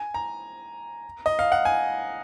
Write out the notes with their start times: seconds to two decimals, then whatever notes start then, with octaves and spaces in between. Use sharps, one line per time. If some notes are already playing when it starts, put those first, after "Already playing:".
Already playing: G#5
0.14 A#5
1.26 D#5
1.39 F5
1.52 F#5
1.65 G#5